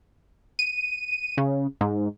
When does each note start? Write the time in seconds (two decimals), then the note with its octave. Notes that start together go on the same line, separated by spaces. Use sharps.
0.59 D#7
1.38 C#3
1.81 G#2